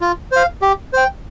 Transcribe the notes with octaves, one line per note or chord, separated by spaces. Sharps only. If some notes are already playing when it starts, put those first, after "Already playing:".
F4
C5 F5
G4
C5 G5